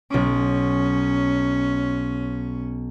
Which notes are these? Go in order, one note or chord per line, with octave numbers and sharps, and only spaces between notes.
B1 C#4 D6